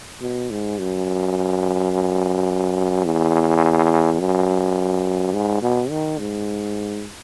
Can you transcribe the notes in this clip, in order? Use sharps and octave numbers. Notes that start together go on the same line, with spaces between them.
B2
G#2
F#2
E2
F#2
G#2
B2
D#3
G#2